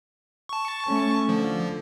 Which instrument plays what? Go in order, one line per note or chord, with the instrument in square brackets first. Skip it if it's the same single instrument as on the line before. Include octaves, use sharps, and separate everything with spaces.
[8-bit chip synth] A5 C#6
[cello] A3 C#4
[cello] D3 [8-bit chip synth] F3